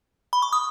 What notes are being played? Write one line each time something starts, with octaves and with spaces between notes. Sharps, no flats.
B5
C#6
D#6